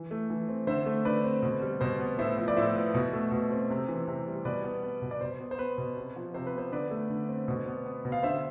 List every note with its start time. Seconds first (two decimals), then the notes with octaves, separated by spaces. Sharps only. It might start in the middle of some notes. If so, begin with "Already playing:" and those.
Already playing: E3
0.11 A3
0.30 E3
0.49 C4
0.67 D3 C5 E5
0.86 A3
1.05 D3 B4 D5
1.24 C4
1.43 B2
1.62 G3
1.81 B2 C5
2.00 B3
2.18 A2 C5 E5
2.38 F3
2.48 D5
2.56 A2 C5 E5
2.76 B3
2.94 B2
3.13 A3
3.32 B2
3.51 C4
3.70 C3
3.88 E3
4.08 C3
4.27 G3
4.45 B2 B4 D5
4.64 B3
4.83 B3
5.02 B2
5.11 D5
5.21 B2 C5
5.41 B3
5.51 C5
5.59 B3 B4
5.78 B2
5.97 C3
6.16 F3
6.34 C3 C5
6.47 B4
6.54 B3 C5
6.72 D3 B4 D5
6.91 A3
7.10 D3
7.29 C4
7.48 B2
7.67 B3
7.86 B3
8.05 B2
8.12 F5
8.23 D3 C5 E5